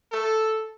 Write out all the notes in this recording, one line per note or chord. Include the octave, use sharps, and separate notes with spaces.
A4